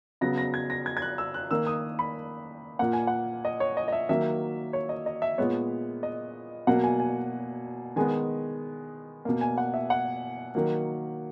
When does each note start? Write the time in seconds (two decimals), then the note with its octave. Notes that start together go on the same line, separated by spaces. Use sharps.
0.21 C#3 F#3 B3 A#6
0.38 A#6
0.54 G#6
0.70 A#6
0.86 G#6
0.97 G#6
1.02 F#6
1.18 E6
1.34 F#6
1.51 D#3 A#3 E6
1.67 D#6
1.99 B5
2.79 A#2 A#3 F#5
2.93 G#5
3.07 F#5
3.45 D#5
3.60 C#5
3.77 D#5
3.88 D#5
3.92 E5
4.09 D#3 F#3 A#3 E5
4.73 C#5
4.89 D#5
5.06 D#5
5.22 E5
5.38 A#2 G#3 B3 C#5
6.03 D#5
6.67 B2 F#3 A#3 F#5
6.84 G#5
7.00 G#5
7.96 D#3 G#3 B3 G#5
9.25 B2 A#3
9.41 G#5
9.58 F#5
9.74 E5
9.90 F#5
10.55 D#3 F#3 A#3